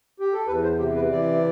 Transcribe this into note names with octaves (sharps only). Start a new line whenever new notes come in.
G4
A4
E2 B4
C5
C3 G4
B4
E3 D5